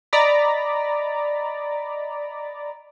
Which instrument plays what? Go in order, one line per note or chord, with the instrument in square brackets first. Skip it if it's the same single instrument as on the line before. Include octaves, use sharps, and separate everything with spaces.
[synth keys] D5 D#5 A#5 B5 A6